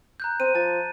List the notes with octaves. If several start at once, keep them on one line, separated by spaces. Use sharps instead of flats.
A#5 F#6 G6
C4 D#7
F3 A5 A6